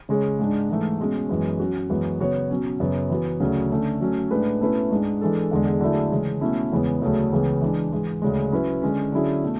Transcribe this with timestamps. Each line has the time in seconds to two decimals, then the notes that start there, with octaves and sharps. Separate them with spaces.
0.09 C#3 G#3 C#4 G#4 C#5
0.39 G#2 G#3 D4
0.69 G#2 E3 A3
1.00 B2 G#3 C#4
1.29 F#2 E3 G#3 B3
1.60 F#3 C#4 F#4
1.89 F#2 E3 G#3 B3 F#4
2.20 C#3 F#3 B3 F#4 C#5
2.50 B2 F#3 C#4
2.80 F#2 C#3 F#3 B3
3.10 E3 B3 F#4
3.40 D2 C#3 F#3 C#4
3.70 D3 A3 C#4
4.01 F#3 A3 C#4
4.31 A2 G#3 D4 G#4 B4
4.61 B2 A3 C#4 E4 B4
4.91 G#2 G#3 D4 G#4
5.21 E3 G#3 D4 A4
5.51 E2 D3 G#3
5.81 D3 F#3 A3 E4 G#4
6.11 C#3 E3 G#3
6.41 B2 A3 C#4 E4
6.72 E2 C#3 E3 G#3 B3
7.02 D2 C#3 F#3 A3
7.32 C#2 C#3 E3 B3
7.62 E3 G#3 D4
7.92 G#2 E3 G#3
8.22 D2 C#3 G#3
8.52 F#3 C#4 E4 B4
8.82 D3 G#3 C#4
9.12 D3 F#3 C#4 E4 G#4
9.44 B2 A3